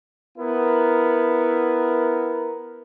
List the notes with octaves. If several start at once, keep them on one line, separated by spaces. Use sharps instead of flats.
B3 E4 A#4